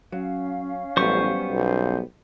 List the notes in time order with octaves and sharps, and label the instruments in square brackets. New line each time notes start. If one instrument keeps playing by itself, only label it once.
[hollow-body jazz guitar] F#3 [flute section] C#4 F5
[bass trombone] A1 [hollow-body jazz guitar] F#3 G3 B3 [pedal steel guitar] C5 C#6
[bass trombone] B1